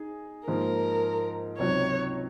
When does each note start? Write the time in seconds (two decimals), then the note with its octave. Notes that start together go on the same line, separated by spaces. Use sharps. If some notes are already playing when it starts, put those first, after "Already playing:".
Already playing: D#4 G#4
0.47 G#2 F3 A#3 A#4
1.58 C#2 C3 F#3 C4 D#4 C#5